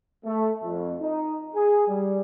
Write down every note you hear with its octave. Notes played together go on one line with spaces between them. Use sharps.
A3
F2
D#4
G#4
G3